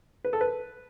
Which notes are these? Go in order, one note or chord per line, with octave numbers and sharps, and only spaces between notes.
B4
A4
B4